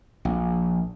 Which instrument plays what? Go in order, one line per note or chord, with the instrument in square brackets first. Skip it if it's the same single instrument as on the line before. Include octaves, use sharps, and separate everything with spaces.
[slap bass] A#1